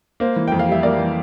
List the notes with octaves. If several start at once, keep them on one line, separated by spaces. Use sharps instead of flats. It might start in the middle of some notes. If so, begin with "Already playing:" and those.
A#3 C5
E3
F2 G5
F5
G3 E5
A#3 A#4 D5
E3